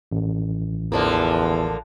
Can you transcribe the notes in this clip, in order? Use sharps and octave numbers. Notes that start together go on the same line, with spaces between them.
A1
E2 D3 F3 A#3